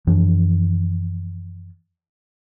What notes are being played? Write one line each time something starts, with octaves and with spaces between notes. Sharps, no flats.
F#2 E3 F3 D4